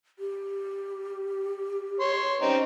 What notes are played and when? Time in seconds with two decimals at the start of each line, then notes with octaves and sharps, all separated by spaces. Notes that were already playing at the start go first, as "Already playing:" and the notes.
0.19 G4
2.01 C#5 C6
2.42 G3 C4 C#4 D#4